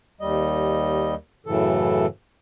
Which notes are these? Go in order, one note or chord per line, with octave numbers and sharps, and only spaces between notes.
D#2 G3 D#5
F#2 A2 C#3 E3 A4